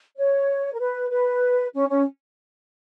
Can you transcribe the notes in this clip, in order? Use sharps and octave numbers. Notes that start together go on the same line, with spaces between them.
C#5
A#4
B4
B4
C#4
C#4